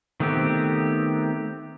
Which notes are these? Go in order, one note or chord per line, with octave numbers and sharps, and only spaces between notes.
D#3 A3 B3 C4 G4